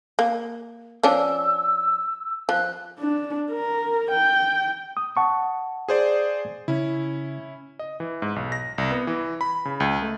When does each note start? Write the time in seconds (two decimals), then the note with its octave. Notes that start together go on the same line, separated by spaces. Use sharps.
0.19 A#3
1.03 F3 C#4 D4 E6
2.49 F3 F#6
2.99 D4
3.51 A#4
4.11 G5
4.97 D#6
5.17 F#5 A5 C#6
5.88 G#4 C5 D5
6.68 C#3 C#4 E4
7.79 D#5
8.00 E3
8.22 G#2
8.36 B1
8.52 A#6
8.78 C2
8.91 B3
9.07 E3
9.41 B5
9.65 C#3
9.80 C#2
10.02 A3